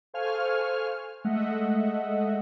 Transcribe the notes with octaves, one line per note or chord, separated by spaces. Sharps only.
A4 C5 F5 G#5 C#6 F6
G#3 A3 D#5 E5 F#5